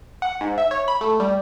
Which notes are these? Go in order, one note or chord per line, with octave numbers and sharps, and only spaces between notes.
F#5
G#2
E5
C#5
B5
A3
G3